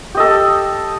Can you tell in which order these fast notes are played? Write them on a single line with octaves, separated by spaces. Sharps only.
G4 D#5 A4